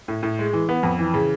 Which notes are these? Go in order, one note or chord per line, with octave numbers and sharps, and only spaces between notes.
A2
A2
G#3
E3
B3
F2
E3
C#3